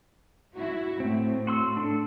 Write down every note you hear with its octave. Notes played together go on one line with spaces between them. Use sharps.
E4 F#4
A2 C4
F#4 C6 E6
D4 A4